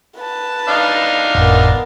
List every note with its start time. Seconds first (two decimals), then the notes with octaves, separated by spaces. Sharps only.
0.18 B4 A5
0.69 D4 D#4 F5
1.35 G1 F2 A2 B3 A#4